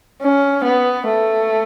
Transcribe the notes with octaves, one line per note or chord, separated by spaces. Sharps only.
C#4
B3
A3